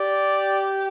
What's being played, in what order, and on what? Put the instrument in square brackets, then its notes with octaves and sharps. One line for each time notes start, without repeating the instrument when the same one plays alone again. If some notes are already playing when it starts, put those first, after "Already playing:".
Already playing: [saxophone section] G4 [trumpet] D5